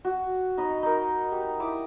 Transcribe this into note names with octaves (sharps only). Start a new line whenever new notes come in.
F#4
D#4 D#5 B5
D#4 A#4
G4
E4 D6 D#6